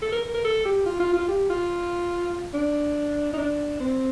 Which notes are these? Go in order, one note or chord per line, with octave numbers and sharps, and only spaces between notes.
A4
A#4
A#4
A#4
A4
G4
F4
F4
F4
G4
F4
D4
D#4
D4
C4